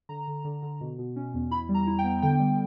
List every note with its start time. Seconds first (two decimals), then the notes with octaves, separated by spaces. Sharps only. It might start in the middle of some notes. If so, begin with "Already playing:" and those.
0.09 D3 A#5
0.27 D3
0.44 D3
0.63 D3
0.81 B2
0.98 B2
1.16 C#4
1.34 E2
1.51 E4 B5
1.69 G3
1.74 A#5
1.87 E4
1.99 G5
2.04 B3
2.22 D3 G5
2.40 G3